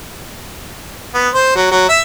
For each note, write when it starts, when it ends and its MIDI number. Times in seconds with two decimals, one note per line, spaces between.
1.14 1.29 59
1.34 1.52 72
1.56 1.71 54
1.71 1.89 54
1.89 2.02 76